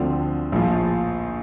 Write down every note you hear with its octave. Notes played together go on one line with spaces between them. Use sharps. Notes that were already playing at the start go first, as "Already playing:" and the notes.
Already playing: D2 D3 F3 C4
A#1 A2 F3